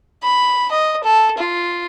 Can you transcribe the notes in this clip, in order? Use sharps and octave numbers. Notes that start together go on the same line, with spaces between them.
B5
D#5
A4
F4